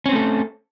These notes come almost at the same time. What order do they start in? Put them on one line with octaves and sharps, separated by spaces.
C#4 C4 A3 A4